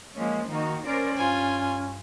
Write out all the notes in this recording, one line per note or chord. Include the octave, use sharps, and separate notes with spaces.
F3 G#3 A#3 C#4
D#3 A#3 D#4 F#4
C#4 A#4 C5 D5
G2 F4 G#5